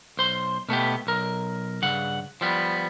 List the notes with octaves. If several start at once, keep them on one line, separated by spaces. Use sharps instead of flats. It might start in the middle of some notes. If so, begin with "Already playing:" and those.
B1 C5 C6
B2 A3 B3 G4
B1 A#4
G2 C#3 F#5
F3 G3 B3